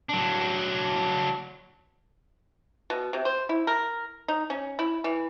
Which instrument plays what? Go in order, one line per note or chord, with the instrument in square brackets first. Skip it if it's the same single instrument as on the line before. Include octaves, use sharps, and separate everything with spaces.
[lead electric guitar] F#3 D4
[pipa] B2
C3
C5
E4
A#4
D#4
C#4
E4
E3